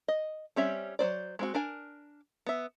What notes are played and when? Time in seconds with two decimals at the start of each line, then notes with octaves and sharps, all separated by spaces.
0.08 D#5
0.56 G3 C4 C#4 C#5 E5
0.99 F#3 C4 C5 D5
1.39 G#3 C4 F#4
1.55 D4 A#4 G#5
2.46 B3 E5